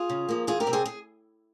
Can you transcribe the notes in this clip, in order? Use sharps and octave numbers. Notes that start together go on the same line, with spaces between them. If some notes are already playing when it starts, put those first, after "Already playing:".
Already playing: F4 G#4
C#3
F3 A#3
E2 F4 G#4
G4 A#4
C3 G3 C4
G#4 C5
G#4